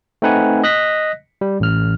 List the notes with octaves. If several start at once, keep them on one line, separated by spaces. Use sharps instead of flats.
A3 C4 D#4 B4 F#5 G#5
D#5 F#6 A#6 B6
G3
A1 F6